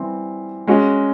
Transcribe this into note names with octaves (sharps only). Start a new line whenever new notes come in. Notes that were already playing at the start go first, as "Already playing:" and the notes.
Already playing: E3 G3 C4
G#3 C#4 F#4